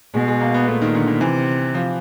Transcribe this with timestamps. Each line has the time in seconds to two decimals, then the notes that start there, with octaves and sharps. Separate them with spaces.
0.14 B2 G#3
0.28 G#3
0.41 A#3
0.54 B3
0.68 A#2 A3
0.81 D#3
0.95 D3
1.07 D#3
1.21 C3 E3
1.74 F3